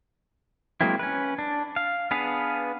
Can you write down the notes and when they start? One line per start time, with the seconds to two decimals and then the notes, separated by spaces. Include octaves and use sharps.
0.81 F#3 G#3 A#3 C4 E4
0.99 C#4 B4
1.39 D4
1.76 F5
2.11 B3 D4 G#4 B4 F5